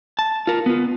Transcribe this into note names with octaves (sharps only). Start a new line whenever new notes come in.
A5
F4 A#4
B3 F4